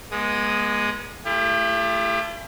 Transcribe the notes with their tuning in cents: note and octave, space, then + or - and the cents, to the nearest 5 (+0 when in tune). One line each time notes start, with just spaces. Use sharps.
G#3 +0 B3 -40 D#6 +0
A3 +0 E4 +45 G4 +40